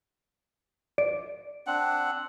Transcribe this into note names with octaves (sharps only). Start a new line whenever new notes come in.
D5 D7
C4 D4 F#5